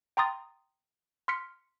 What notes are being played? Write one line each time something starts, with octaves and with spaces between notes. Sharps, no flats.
G5 A#5 C6 D#6 A6
C6 F6 B6 C#7